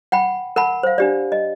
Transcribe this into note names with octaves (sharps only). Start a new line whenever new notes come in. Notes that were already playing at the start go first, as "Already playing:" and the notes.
F#5 G5 B5
A#4 F#5 A5 B5
C5 F5
D4 G4 D5
D#5